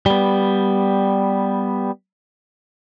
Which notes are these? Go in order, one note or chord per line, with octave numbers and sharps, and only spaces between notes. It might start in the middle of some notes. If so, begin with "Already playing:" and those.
G3 B3